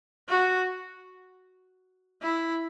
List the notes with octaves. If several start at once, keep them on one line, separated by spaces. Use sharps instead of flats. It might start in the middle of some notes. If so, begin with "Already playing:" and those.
F#4
E4